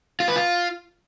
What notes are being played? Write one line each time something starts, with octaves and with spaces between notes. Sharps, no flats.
F4
B4
F4